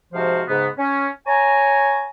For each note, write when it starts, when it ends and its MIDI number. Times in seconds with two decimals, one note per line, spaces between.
0.13 0.41 44
0.13 0.41 48
0.13 0.41 53
0.13 0.41 66
0.13 0.41 72
0.13 0.41 77
0.47 0.66 44
0.47 0.66 49
0.47 0.66 59
0.77 1.07 61
1.26 2.06 73
1.26 2.06 80
1.26 2.06 82